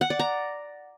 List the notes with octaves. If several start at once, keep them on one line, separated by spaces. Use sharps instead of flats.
F#5
D5
A#5